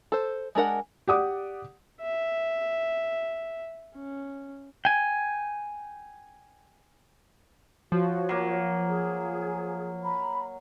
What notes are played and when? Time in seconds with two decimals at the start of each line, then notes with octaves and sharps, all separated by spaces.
0.12 A4 C5
0.55 G#3 D4 A#4 F#5
1.08 G4 D5 F#5 D6 D#6
2.01 E5
3.95 C#4
4.85 G5 G#5
7.92 F3 F#4 C#5
8.29 F#3 A#3
8.87 G#4
10.02 A#5 B5